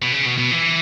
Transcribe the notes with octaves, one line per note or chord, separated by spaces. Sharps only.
B2
C#3
B2
B2
E3